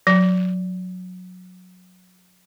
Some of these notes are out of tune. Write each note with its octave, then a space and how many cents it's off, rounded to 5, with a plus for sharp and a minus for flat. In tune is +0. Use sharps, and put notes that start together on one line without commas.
F#3 -20